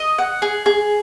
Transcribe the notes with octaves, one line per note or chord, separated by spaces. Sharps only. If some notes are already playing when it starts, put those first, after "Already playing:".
Already playing: D#5
F#5
G#4
G#4